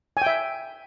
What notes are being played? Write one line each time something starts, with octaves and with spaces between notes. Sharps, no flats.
E5 G5 G#5